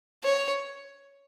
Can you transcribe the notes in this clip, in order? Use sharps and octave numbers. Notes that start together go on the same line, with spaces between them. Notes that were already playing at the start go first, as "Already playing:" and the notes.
C#5